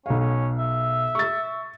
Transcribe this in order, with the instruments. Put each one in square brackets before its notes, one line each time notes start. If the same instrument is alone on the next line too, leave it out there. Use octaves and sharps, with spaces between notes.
[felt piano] B1 F5 [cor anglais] C#4
[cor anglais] C#4
E5
[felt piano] C#6 A6